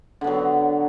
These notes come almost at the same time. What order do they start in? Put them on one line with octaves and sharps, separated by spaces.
D3 B3 F#3